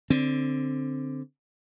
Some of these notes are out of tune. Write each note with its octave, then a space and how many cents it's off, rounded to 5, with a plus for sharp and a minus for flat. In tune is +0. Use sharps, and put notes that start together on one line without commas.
D3 +0 C4 +0